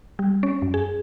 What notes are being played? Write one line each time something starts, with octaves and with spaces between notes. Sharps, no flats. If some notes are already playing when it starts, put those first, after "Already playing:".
G3
C#4
F#2
G#4